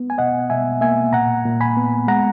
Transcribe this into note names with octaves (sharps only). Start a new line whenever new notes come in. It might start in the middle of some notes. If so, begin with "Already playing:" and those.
Already playing: B3
G#5
B2 D#5 F#5
B2 E5 G#5
A#3 E5 G#5
A#2 F#5 A#5
A#2
G#5 B5
B3
G#3 F#5 A#5